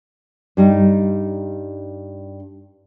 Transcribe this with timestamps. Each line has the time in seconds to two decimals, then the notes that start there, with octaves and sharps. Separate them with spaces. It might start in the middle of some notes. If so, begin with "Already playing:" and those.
0.57 G2 G3 D#4